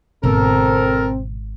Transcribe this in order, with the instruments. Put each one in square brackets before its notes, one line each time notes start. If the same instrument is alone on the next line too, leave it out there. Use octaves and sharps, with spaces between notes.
[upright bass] G#1 [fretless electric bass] B2 D3 B3 [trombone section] C4 [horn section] A4 A#4